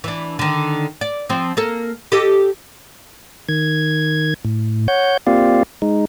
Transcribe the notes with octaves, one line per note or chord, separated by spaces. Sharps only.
E3 D4
D3 D#3
D5
F3 C4
A#3 A4
G4 A4 D#5
D#3 G#6
A2
C#5 F#5 G6
A#3 C4 F4 G4 D5 F5
G#3 D#4